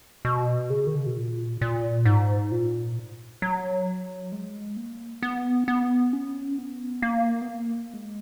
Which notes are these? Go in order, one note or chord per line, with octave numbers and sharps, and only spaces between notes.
B2
C#3
D#3
C#3
B2
A#2
A#2
G#2
A#2
F#3
G#3
A#3
B3
B3
C#4
B3
A#3
B3
A#3
G#3